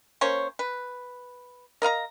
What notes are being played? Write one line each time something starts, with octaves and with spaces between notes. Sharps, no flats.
A#3 C#4 C5 C#5
B4
A#4 D#5 F5 A#5